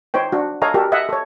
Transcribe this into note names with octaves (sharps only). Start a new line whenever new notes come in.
D#4 C5 C#5 G5
D4 F#4
A4 C#5 D#5 F5 G#5 A#5
F#4 G4 A4 A#4
D#5 E5 F#5
A4 C#5